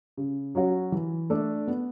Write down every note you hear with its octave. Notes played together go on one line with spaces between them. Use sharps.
C#3
F#3 C#4 F#4
E3
A3 D4 A4 D5
B3